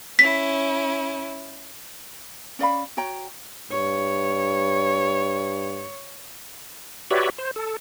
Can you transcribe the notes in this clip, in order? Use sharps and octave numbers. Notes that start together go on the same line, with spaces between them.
C#4 E4 B6
C#4 D5 F5 B5
F#4 C#5 G5 A#5
G2 C#5
F#4 G4 B4 C#5 D5 E5
C5
A4